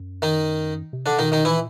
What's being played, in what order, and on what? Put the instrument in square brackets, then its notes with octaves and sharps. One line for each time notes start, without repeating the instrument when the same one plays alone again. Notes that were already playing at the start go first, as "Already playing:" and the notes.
Already playing: [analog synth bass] F#2
[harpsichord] D#3 D#4
[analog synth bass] C3
[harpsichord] D3 D4
[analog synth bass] B2 [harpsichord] D#3 D#4
[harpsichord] D#3 D#4
[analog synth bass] A#2 [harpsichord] E3 E4